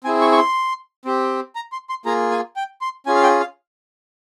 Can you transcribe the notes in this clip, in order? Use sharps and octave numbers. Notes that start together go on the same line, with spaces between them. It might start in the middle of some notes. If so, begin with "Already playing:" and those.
C4 E4 G#4 G#5
C#6
C#6
C6
C4 G4
A#5
C6
C6
A#3 F4 G#4 A#5
G#5
G5
C6
C#4 F4 G#4 G#5
F5
G5
F5